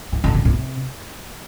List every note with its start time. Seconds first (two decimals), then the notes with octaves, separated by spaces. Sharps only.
0.13 E3
0.24 D3
0.34 D3
0.45 C3